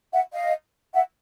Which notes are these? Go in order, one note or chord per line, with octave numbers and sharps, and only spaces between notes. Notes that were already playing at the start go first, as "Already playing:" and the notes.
E5 F#5
D#5 F5
E5 F#5